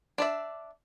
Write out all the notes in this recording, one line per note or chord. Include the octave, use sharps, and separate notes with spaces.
D4 D5 E5